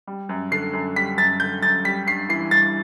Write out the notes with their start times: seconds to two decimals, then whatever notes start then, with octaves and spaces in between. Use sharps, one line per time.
0.07 G3
0.29 F#2
0.51 D3 C7
0.73 F#2
0.96 G3 B6
1.18 F#2 A6
1.40 D3 G6
1.62 F#2 A6
1.85 G3 B6
2.07 G2 C7
2.29 E3 C7
2.51 G2 A6